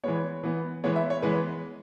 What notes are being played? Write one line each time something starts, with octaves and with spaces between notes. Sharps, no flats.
E3 G#3 B3 C#5
E3 B3
E3 G#3 B3 C#5
E5
C#5
E3 G#3 B3 B4